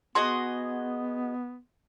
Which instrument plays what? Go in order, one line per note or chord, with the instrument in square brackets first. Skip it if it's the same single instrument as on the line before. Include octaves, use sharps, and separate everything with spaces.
[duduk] B3 [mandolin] F#4 G#4 D#5 [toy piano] C6